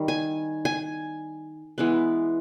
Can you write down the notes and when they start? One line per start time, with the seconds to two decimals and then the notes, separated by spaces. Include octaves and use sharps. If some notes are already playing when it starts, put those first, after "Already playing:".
Already playing: D#3 G3
0.08 G#5
0.65 G#5
1.78 E3 G#3 B3